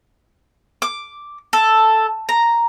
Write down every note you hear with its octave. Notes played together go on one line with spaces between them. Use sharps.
D6
A4
A#5